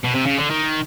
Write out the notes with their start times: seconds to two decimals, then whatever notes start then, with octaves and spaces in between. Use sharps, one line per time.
0.04 B2
0.15 C3
0.26 C#3
0.38 D3
0.50 D#3